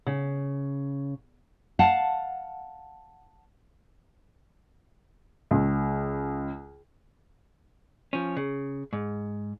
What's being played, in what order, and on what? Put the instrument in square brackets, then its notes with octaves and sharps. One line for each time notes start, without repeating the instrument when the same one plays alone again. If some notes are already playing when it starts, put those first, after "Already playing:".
[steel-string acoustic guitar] C#3
[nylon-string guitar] F5 F#5 A5
[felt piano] C#2
[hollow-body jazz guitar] F3 C#4
C#3
G#2